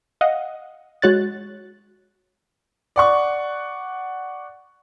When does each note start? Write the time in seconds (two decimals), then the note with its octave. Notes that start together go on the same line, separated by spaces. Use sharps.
0.21 D#5 F5 F#5
1.02 G#3 F#4 C#5 F#6 A6
2.96 D5 F#5 C#6